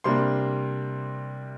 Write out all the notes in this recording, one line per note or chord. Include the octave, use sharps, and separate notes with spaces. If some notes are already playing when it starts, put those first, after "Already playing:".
C3 G3 A#3 D4 C6